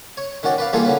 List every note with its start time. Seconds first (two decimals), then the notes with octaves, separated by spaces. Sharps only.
0.17 C#5
0.43 D#3 C#4 F#4 D5 G5
0.58 B4 D5 F5
0.73 E3 G3 A#3 F4 G#4 A4
0.85 D3 C#4 B4